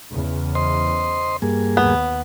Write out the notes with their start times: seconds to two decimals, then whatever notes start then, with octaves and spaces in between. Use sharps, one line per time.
0.12 E2 C#3
0.55 C5 D#5 C6
1.42 G2 A#3 G#4
1.77 D#2 B3